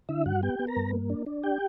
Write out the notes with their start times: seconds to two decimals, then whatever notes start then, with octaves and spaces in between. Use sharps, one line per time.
0.09 D3 E4 E5
0.26 G2 F#4 F#5
0.43 B3 G4 G5
0.59 B3
0.67 A#4 A#5
0.77 G2
0.93 A#3
1.10 D4
1.26 D4
1.43 G4 G5